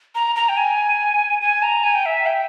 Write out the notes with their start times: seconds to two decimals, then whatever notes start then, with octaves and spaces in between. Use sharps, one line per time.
0.15 A#5
0.36 A#5
0.49 G5
0.57 G#5
1.41 G#5
1.63 A#5
1.84 G#5
1.95 G5
2.06 E5
2.26 G5